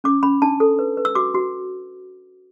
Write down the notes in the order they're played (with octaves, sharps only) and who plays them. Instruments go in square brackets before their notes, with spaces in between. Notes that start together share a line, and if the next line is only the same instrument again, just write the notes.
[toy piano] C#4 D6
C#4 B5
D4 A5
A4
B4
B4
E6
F#4 D6
F#4